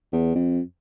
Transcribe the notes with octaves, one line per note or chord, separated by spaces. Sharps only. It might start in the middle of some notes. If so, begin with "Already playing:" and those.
E2
F2